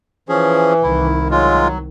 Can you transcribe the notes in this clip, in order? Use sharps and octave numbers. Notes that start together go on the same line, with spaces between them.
E3 F3 C#4 G#4
C2 D#3 E4
F#3 G#3 F4